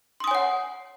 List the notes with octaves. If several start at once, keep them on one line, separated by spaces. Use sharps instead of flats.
C#5 F#5 G#5 C6 D#6